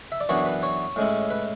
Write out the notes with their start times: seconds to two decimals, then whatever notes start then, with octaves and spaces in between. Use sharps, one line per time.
0.12 E5
0.21 D5
0.29 F#2 E3 B3 D4 C#5
0.46 B4
0.63 C#5
0.96 A2 G#3 C#4 E4
1.30 B4